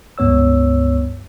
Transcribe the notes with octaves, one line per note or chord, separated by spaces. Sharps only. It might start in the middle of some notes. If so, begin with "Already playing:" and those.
C#2 G2 B3 C#5 E6